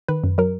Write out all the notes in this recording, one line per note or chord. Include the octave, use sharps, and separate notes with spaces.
D#3 B4
F#2
F#3 A#4